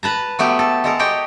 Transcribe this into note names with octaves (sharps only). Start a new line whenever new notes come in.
B4 A5 A#5
F#3 A3 B3 G4
A4
G#3 A4 A#4
G4 C#5 D#5 G5